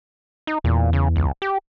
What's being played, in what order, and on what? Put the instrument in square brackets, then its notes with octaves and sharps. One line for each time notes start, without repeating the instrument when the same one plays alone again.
[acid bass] D#4
[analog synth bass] E2 [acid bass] A#2
[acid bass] C#3
C#2
G4